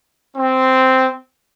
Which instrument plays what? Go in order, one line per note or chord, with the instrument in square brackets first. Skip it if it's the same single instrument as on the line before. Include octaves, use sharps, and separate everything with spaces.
[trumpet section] C4